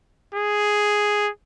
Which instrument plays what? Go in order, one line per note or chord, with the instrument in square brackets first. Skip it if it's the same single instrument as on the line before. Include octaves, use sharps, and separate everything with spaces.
[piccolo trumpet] G#4